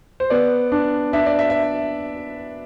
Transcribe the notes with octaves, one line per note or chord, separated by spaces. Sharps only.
C5
B3 D5
D4
D4 E5
D5
E5
E5